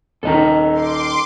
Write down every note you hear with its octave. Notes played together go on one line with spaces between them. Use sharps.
D#1 D#3 A4 D#5 A#5
C6 D6